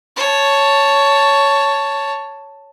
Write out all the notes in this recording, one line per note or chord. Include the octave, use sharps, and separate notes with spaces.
C#5 A5